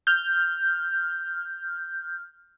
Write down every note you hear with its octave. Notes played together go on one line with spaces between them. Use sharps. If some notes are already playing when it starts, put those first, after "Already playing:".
F6 G6